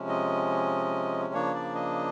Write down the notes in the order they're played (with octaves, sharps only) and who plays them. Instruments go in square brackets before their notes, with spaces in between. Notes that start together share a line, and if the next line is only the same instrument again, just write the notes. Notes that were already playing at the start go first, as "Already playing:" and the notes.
Already playing: [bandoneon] C3 F3 G#3 C#4
D#5
C#3 F3 A#3 D4 C#5
D5
D#5